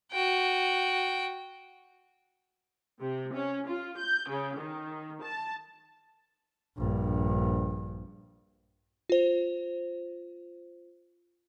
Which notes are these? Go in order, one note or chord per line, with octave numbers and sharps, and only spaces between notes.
F#4 G5
C3
C#4
F4
G6
C#3
D#3
A5
A#1 G2
F4 C5